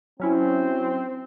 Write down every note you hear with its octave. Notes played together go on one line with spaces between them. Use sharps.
F#3 C4 C#4 E4